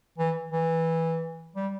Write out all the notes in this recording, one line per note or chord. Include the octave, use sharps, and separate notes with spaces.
E3
E3
G3